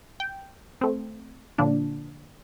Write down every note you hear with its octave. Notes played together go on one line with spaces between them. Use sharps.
G5
A3 C4
A#2 D3 F3 D4